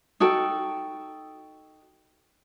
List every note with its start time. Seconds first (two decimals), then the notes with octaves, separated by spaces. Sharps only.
0.20 D#4 F#4 A4 G5